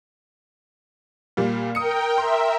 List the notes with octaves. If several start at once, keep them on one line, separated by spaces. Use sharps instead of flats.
A#2 G3
A#4 G5 D#6 C#7
A#4 E5 C6